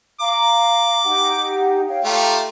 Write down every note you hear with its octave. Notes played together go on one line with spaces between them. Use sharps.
F5 A#5 D6
D#4 G4 F#5
C#5 F5 G5
A3 F4 G4 A#5